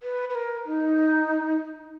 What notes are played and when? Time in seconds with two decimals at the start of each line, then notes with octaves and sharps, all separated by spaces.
0.03 B4
0.30 B4
0.35 A#4
0.66 D#4